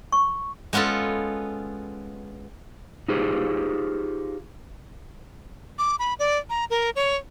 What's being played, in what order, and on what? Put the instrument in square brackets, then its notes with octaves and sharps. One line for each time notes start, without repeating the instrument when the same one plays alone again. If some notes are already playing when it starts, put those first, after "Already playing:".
[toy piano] C#6
[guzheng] G#3 B3 C#4 F4 A4
[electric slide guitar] D#4 F4 G4 G#4 C5
[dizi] D6
B5
D5
A#5
A#4
C#5